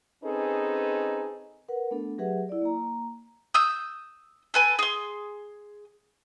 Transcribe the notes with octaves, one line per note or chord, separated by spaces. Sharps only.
C4 C#4 D#4 G#4 A4 B4
A#4 B4 F#5
A3 B3 D4 A4
F#3 G4 G#4 B4 E5 F#5
E4 D5
A#3 A#5
D#6 E6 G6
A4 B4 G#5
G#4 C6